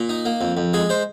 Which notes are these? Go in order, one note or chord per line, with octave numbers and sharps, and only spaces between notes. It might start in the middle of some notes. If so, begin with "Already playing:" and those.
Already playing: A#2 A#4
D#4
A#3
F2
F2
G#3 G#4
G#3 C5